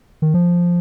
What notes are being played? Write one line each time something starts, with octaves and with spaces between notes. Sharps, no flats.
D#3
F3